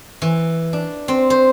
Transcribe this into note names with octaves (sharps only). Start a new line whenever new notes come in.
E3
D4
C4
C5